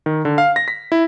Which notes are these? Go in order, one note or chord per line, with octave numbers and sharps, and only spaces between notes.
D#3
D3
F5
A#6
B6
E4